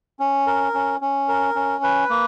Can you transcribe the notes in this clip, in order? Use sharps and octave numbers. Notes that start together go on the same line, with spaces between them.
C#4
A#4
C#4
C#4
A#4
C#4
B4
A#3